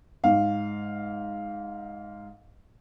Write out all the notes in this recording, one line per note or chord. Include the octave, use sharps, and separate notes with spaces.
G#2 F5